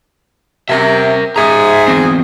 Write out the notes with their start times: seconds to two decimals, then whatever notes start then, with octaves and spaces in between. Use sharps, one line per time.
0.69 C3 A#4 E5
1.36 G#2 G#4 E5 A#5
1.88 E2 C4